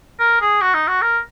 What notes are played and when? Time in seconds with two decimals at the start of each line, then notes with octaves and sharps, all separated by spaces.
0.20 A#4
0.41 G#4
0.61 F#4
0.74 D#4
0.88 F#4
1.02 A#4